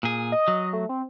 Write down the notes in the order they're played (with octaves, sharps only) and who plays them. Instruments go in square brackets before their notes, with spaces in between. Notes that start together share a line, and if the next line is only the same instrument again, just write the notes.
[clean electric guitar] A#2 G#4
[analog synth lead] D#5
[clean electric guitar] F#3
[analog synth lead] A3
C4